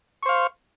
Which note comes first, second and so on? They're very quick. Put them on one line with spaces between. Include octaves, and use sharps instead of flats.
C#6 C5 F5